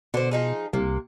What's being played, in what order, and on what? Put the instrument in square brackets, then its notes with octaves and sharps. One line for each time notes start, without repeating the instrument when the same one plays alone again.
[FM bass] B2 [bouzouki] D3 C5
[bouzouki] F3 D#4 G#4
[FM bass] C2 [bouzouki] C3 A#3